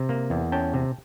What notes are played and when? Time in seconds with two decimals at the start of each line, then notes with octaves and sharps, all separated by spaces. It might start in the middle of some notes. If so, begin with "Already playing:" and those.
Already playing: C3
0.09 A#3
0.30 E2
0.52 C#4 G5 A5
0.74 C3